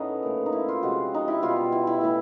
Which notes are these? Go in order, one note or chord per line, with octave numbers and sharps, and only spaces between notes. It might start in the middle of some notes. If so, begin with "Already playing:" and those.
Already playing: A2 A3 B3 C#4 D#4
A#2 F3 A3
D#4
E4
F4
C3 F3 G#3 F#4
D#4
E4
B2 G3 F4
E4
E4
A2 E3 G3